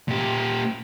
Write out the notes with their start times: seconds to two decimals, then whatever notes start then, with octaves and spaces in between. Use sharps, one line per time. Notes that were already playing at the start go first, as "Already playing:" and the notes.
0.08 A#2 G4